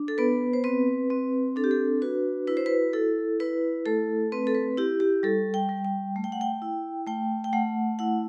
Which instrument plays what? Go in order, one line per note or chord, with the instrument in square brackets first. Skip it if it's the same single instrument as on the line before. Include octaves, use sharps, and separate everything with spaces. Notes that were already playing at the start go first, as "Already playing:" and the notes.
Already playing: [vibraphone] D4
A4
B3 B4
C5
C4 B4
C4
D4 A4
G4
A4
F#4 B4
E4 B4
C5
B4
E4 A4
E4 B4
A3 A4
C4 B4
A4
B4
E4 G4
G4
G3 A4
G5
G3
G5
A3
G5
F#5
G5
E4
A3 G5
G5
A3 F#5
E4 F#5